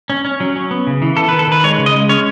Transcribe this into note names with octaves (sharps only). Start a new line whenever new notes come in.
C#4
C#4
F#3
C#4
B3
C#3
E3
B3 A4
D#3 B4
A4
D#3 B4
G#3 C#5
C#3
D#5
G#3
C#4 C#5